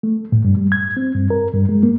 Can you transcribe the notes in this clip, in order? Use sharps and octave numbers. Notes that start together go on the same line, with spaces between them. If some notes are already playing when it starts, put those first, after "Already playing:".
A3
A2
G2
G3
G#6
C4
G2
A#4
G2
G#3
A#3